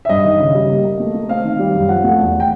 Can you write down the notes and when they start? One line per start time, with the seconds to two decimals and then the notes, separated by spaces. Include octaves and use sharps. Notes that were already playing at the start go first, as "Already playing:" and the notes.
0.05 E5
0.09 G2 D#5
0.25 D#3
0.39 C#3
0.54 G3
0.69 A#3
0.84 A#3
1.00 A3
1.14 A3
1.29 C4 F5
1.44 D#3
1.59 G3
1.74 F#2
1.89 F3 F#5
2.04 A3
2.19 E2
2.40 G5